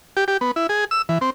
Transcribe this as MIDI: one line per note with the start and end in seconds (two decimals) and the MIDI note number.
0.17 0.24 67
0.28 0.37 67
0.41 0.51 59
0.56 0.67 64
0.69 0.85 68
0.91 1.02 88
1.09 1.18 52
1.21 1.30 60